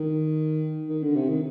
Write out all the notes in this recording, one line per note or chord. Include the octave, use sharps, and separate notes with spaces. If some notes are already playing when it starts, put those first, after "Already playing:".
Already playing: D#3
D#3
D3
C3
D#3